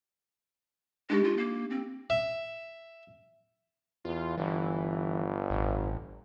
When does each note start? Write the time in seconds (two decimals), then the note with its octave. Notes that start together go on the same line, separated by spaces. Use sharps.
1.10 G#3 D4 D#4 G4
1.24 F4
1.37 A#3
1.70 C4
2.10 E5
4.05 E2 F4
4.38 G1 E3
5.50 A1